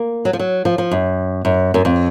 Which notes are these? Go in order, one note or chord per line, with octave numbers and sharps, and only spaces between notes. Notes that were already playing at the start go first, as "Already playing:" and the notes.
Already playing: A#3
F#3
F3
F#3
F3
F3
F#2
F#2
F#2
F2